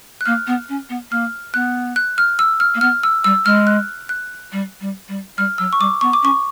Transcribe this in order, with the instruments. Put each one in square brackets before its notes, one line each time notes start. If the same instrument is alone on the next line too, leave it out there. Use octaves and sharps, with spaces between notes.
[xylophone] F#6
[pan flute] A#3 [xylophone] F6
[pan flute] B3
C#4
B3
[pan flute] A#3 [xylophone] F6
[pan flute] B3 [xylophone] F#6
[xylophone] F#6
F6
E6
F6
[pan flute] A#3
[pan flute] B3 [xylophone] F6
[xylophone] E6
[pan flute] G3 [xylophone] E6
[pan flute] G#3 [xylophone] F6
[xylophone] F#6
F#6
[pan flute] G3
G3
G3
[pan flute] G3 [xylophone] F6
[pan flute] F#3 [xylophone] E6
[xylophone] C#6
[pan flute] G3 [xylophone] D6
[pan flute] B3 [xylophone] C#6
[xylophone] D6
[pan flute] C#4 [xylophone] C#6